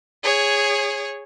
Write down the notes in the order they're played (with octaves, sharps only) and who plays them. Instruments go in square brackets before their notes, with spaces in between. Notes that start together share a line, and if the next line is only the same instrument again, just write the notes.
[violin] G#4 C#5